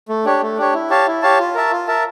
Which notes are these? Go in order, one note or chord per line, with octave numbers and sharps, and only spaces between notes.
A3
D4 G4 C#5
A3
D4 G4 C#5
E4
G4 C#5 F5 A5
E4
G4 C#5 F5 A5
F4
A#4 E5 A5
F4
A#4 E5 A5